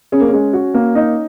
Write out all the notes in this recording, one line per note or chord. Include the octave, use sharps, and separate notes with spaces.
C#4 G#4
A#3
G#3 C#4
F#4
A#3
D#4